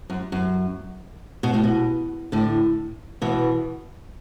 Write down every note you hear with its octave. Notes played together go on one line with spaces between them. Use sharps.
F#2
F#2
B2
A2
B2
A2 D3
B2 E3